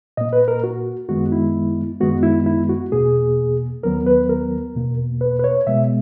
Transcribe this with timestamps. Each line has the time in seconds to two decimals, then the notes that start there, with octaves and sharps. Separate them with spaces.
0.17 A#2 A#3 D#5
0.33 B4
0.48 A#4
0.64 F#4
1.09 F#2 D#3 G#3 B3 F#4
1.32 E4
2.00 F#2 D#3 G#3 B3 F#4
2.23 E4
2.46 E4
2.69 F#4
2.92 E2 B2 A#3 G#4
3.83 D#2 D#3 F#3 B3 A#4
4.06 B4
4.29 A#4
4.75 E2 B2 A#3
5.21 B4
5.39 B4
5.44 C#5
5.67 B2 G#3 B3 E5